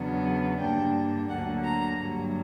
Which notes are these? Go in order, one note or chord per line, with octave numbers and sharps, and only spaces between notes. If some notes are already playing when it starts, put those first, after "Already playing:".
Already playing: E2 C#3 F#3 B3 D4
G2 D3 A#3 D4 G5
D2 D3 F#3 A#3 F#5
A#5
G2 F#3 A#3